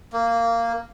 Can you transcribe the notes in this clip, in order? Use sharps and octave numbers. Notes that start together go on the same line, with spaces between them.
A#3